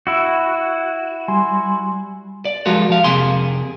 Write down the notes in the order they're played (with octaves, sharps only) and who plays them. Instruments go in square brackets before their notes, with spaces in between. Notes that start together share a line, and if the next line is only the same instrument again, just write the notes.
[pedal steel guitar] E4 F#4
[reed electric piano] G3 G#5 C6
[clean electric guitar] D5
F3 G3 G#3 F4 F#4 A#4
F3 F5
F2 C3 A#3 G#4 C6